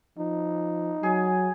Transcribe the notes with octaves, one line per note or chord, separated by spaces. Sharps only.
F3 D#4
F#3 G#4